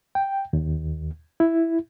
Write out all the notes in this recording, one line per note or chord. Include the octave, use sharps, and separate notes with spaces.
G5
D#2
E4